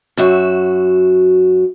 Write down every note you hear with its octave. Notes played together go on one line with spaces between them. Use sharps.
F#2 F#4 E5